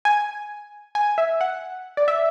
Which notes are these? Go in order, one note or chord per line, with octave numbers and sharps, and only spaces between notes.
G#5
G#5
E5
F#5
D5
E5